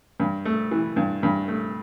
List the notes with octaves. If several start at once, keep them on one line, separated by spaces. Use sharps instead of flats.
G2
A3
E3
G2
G2
A3